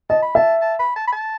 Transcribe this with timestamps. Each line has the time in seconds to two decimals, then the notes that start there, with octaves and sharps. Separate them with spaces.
0.10 D#5 A5
0.22 B5
0.35 E5 A5
0.62 A5
0.79 B5
0.96 A5
1.07 B5
1.12 A5